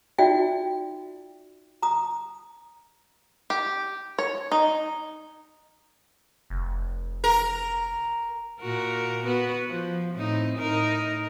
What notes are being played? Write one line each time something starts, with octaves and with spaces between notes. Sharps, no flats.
D#4 F4 F#4 D5 E5 G5
A#5 D#6
G4
C#5
D#4
F1
A#4
A#2 F#4 A#4
B3 F#4 B4
F3
A2 C4 D#4
A2 D#4 A#4